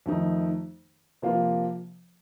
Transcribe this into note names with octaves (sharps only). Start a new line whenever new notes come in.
F2 D#3 A3 D#4
C3 F3 A#3 F4 C5